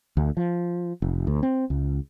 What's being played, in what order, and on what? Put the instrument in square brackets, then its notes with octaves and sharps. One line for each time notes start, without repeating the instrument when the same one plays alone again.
[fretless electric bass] D2
F3
F1
D2
C4
C#2